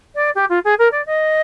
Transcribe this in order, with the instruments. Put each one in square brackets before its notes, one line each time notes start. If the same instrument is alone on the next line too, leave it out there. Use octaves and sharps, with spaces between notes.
[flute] D5
G4
F4
G#4
A#4
D5
D#5